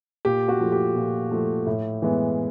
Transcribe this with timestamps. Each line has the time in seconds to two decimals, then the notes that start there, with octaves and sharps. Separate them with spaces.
0.25 A#2 G4
0.48 F#4
0.60 F3 A3
0.72 G4
0.96 A#2
1.31 F3 A3
1.66 A2
2.02 E3 G#3 B3